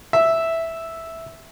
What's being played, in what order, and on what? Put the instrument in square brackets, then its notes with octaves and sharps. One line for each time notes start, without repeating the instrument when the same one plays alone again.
[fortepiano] E5